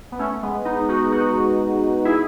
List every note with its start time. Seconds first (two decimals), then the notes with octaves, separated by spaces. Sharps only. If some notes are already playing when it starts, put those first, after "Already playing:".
0.12 B3
0.19 A3 C#4
0.43 G#3 B3
0.65 B3 D#4
0.88 D#4 F#4
1.12 D#4 F#4
2.05 E4 G#4